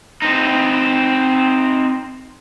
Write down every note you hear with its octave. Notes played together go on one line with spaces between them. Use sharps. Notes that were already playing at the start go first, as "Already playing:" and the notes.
C4 D#4